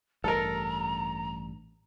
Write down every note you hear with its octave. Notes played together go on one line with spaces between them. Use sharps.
A1 G2 A4 A#4 A#5